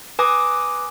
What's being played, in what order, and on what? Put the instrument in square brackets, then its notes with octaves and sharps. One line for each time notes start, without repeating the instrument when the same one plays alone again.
[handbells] B4 G#5 D6 D#6 A#6